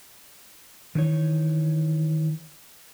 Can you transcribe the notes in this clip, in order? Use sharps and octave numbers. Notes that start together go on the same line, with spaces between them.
D#3 E3 D#4 C#5